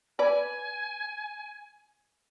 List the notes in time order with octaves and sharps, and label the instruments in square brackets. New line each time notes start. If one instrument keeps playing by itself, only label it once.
[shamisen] B4 D5 [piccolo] G#5